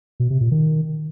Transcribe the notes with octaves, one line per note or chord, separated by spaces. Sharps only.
B2
C3
A#2
D#3